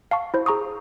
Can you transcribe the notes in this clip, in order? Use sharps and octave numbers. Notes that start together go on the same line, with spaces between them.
F5 A5 C#6
E4 C5
G#4 A#5 C#6 D#6